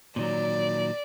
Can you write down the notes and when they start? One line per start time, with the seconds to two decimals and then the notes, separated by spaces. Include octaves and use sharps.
0.16 A#2 D#3 F#3 D5